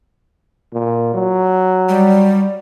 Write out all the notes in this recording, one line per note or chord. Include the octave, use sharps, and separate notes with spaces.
A#2
F#3
G3